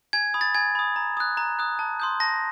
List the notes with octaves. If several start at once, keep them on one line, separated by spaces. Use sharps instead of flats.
G#5 G#6
B5 D#6
A6
G#5 G#6
B5 D#6
A#5
D#6 F#6
A#5
D#6 F#6
A5
C6 D#6 G6
A5 A#6